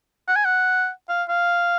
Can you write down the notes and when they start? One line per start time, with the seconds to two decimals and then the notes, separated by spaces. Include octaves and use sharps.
0.28 F#5
0.36 G#5
0.45 F#5
1.09 F5
1.29 F5